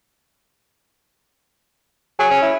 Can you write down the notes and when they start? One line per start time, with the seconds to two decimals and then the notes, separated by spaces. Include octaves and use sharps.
2.19 F#3 G#4
2.31 C#4
2.42 E4